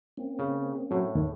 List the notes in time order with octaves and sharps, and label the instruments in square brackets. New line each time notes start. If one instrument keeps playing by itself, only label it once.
[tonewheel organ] A#3 C4 C#4
[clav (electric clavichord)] C#3
[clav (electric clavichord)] A2 [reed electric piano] F#3
[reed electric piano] D#2